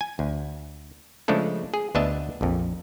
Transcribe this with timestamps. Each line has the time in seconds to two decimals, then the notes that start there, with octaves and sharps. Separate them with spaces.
0.01 G#5
0.19 D2
1.28 C#3 F3 G#3 A3 D4 A4
1.74 G#4
1.95 D2 B3 D4 D#5 E5 A5
2.41 A#1 F2